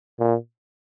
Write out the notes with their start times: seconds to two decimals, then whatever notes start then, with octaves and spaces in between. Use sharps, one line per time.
0.19 A#2